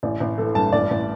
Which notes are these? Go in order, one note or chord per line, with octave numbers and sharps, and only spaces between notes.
A1 D5
A1
E3 A4
G2 A5
A1 D5
A1